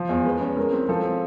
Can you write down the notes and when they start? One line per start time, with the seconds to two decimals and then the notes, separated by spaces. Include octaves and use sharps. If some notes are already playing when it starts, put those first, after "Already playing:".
Already playing: F3
0.09 E2
0.25 G#3 B4
0.41 C#4
0.57 G#3 A#4
0.72 C4
0.89 F3 A4